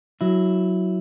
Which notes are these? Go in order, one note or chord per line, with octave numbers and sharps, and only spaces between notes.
F#3 E4